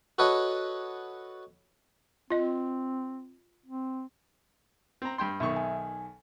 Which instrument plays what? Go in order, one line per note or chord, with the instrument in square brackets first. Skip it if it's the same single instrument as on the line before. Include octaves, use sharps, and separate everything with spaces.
[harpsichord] F#4 A4 B4 C#5 D#5 F#5
[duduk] C4 [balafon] F4 D#5
[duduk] C4
[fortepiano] C4 A#5
G2 G5 C6
[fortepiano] B1 D#3 C#6 [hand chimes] E5
[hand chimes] G#5